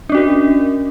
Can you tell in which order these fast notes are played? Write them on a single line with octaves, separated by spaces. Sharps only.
D4 C#4 F#4 A#4